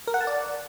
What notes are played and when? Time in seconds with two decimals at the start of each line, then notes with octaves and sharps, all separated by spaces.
0.07 A#4
0.14 F#5
0.21 A5
0.27 D5